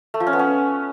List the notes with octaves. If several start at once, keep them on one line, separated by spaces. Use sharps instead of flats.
A3
F3
C#4
B3
C#4